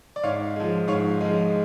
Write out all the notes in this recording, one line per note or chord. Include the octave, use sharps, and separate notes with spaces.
D5
G#2 C#5 F5
F3 G#3
G#2 C#5 F5
F3 G#3